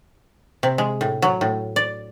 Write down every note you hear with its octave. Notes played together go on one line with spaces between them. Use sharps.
C3
G#3
A2
F#3
A2
D5